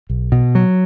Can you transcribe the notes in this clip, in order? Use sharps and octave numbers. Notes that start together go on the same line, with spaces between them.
B1
B2
F#3